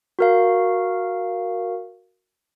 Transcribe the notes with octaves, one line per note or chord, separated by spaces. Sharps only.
F#4 A#4 F5